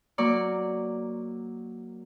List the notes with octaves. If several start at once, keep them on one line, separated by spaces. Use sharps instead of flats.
F#3 A#3 D5 C#6